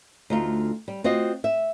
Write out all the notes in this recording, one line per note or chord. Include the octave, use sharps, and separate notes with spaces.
D2 D#4 F4
G3
C4 F4 F#4 D#5
E5